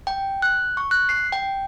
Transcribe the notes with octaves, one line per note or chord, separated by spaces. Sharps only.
G5
F#6
C#6
F#6
C7
G5